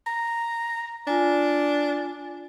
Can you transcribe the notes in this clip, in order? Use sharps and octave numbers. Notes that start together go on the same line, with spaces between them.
A#5
D4 F4 G#5